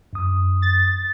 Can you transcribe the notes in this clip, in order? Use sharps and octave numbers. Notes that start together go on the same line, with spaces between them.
F#2 D#6
A6